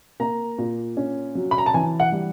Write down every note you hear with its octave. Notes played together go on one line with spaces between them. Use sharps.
A#3 A#5
A#2
C#4
F#3
B5
A#5
A5
E3 G#5
F#5
G3